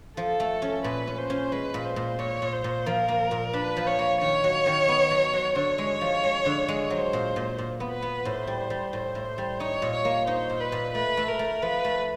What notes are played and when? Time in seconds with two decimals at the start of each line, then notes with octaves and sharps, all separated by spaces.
0.17 F3 A4
0.40 A3
0.62 C#4
0.84 A#2 B4
1.07 C#4
1.18 C5
1.30 C#4
1.52 G#3 B4
1.74 A#2
1.85 C5
1.96 A#2
2.19 A#2 C#5
2.42 A#2
2.52 C5
2.64 A#2
2.86 F3 A#4
3.08 A#3
3.31 A#2
3.53 D4 B4
3.77 F3
3.87 C#5
3.99 A#3
4.21 D#3 C#5
4.44 F#3
4.66 D#3
4.88 B3
5.11 F#3
5.33 F#3
5.55 D3 C#5
5.78 G#3
6.01 F3
6.24 G#3
6.46 D3
6.68 G#3
6.90 F#3 C5
7.13 A#2
7.36 A#2
7.58 A#2
7.80 B3
7.91 B4
8.02 B3
8.25 A2 C5
8.47 G3
8.70 G3
8.92 A2 C5
9.15 A2
9.38 G3
9.60 D#4 C#5
9.82 A#2
9.93 C#5
10.05 A#3
10.27 D#4 C5
10.50 A#2
10.61 B4
10.72 A#2
10.94 A3 B4
11.17 A3
11.28 A#4
11.39 A3
11.62 F3 B4
11.84 A3